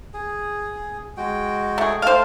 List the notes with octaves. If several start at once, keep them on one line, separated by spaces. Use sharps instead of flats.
G#4
G#3 F#4 G5
A3 G#4
A3 C5 F5 G5 A5